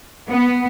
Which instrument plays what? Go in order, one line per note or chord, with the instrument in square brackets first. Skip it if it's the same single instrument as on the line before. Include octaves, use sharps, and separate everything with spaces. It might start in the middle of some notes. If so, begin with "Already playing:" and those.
[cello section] B3